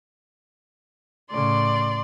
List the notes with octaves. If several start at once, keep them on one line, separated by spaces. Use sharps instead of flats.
A2 C#3 D5 C6